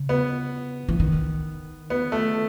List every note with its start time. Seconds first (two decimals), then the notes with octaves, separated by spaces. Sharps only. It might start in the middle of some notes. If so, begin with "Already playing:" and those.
Already playing: C#3
0.09 B3
0.88 E3
1.00 D#3
1.90 B3
2.12 A3